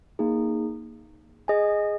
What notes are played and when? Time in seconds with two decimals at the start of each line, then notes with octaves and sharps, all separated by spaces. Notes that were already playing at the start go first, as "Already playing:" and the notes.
0.19 A#3 D#4 G#4
1.48 G#4 D#5 G#5